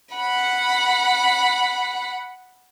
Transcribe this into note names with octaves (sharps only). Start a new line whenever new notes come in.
F#5 B5